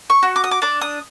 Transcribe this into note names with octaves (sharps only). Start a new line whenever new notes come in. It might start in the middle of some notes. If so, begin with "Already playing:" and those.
C#6
F#4
D6
D#6
D6
D4 D6
D#6